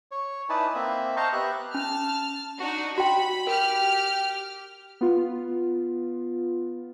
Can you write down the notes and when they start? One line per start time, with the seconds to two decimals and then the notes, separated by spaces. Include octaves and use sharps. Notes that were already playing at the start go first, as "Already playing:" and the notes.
0.11 C#5
0.50 D#4 E4 B4 D5 G#5 A5
0.75 A#3 C4 E5
1.16 C5 D#5 F5 A5 A#5 C#6
1.33 B3 G4 E5 F#6
1.74 C#4 A5 F6
2.60 D4 D#4 F#4
2.98 F#4 G5 B5
3.47 G4 A#4 F6
5.01 B3 F4